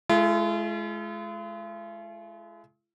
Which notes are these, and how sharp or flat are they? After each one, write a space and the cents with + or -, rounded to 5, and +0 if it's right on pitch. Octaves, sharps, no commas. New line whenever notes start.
G#3 +35 F4 -45 A4 +0